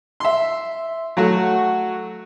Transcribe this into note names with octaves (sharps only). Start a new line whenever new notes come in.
E5 C6
F#3 A3 F#4